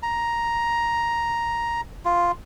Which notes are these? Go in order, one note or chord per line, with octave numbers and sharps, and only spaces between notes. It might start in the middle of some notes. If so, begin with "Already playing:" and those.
A#5
F4